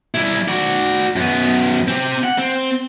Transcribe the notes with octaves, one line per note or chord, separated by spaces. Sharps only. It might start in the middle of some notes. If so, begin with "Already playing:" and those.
G3 E4
F#4 D5
F#2 B3
C4 G4
F#5
C4